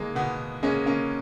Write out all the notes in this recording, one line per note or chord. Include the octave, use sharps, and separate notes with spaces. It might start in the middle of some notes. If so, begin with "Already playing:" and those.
Already playing: G#3 A#3
B2 B3
G#3 A#3 C#4
A#3 C#4